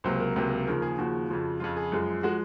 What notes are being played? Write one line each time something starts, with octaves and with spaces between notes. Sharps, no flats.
C#2 C3 F#3 A#3 C5
A#4
C#2 C3 F#3 A#3
D#2 C#3 F3 A#4
G#4
D#2 C#3 F3 F#4
F2 C#3 F3
F2 C#3 F3 F4
G#4
F#2 F3 G#3
F3 G#3 F#4